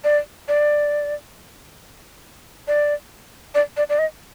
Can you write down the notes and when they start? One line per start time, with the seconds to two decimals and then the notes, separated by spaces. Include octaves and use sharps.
0.04 D5
0.48 D5
2.67 D5
3.54 D5
3.77 D5
3.89 D5
3.98 D#5